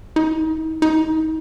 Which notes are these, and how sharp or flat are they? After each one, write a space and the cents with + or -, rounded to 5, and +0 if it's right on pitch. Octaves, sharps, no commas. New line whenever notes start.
D#4 +40
D#4 +30